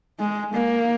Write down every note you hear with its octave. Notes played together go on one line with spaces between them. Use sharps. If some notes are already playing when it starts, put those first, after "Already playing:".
G#3
A#3